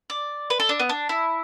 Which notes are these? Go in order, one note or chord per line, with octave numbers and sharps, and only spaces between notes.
D5
B4
A4
D4
B3
D4
E4